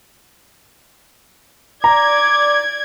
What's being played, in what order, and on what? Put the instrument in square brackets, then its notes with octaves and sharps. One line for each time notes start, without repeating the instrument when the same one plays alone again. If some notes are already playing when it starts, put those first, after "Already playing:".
[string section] D5 G#6 [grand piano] A#5 [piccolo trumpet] D6